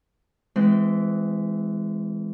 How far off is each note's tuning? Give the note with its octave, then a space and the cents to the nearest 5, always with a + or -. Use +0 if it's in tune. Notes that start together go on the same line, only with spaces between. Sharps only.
E3 +0 G#3 +0 C4 -30